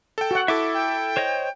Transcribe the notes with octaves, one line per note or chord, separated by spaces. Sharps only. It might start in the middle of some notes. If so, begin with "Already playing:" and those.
A4 G5
F#4 F#5
E4 A4 E5 D6
G5
C5 C#5 D#5